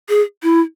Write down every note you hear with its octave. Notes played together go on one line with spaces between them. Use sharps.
G#4
E4